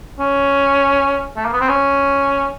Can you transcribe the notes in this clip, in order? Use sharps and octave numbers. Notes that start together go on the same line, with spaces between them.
C#4
A3
A#3
B3
C4
C#4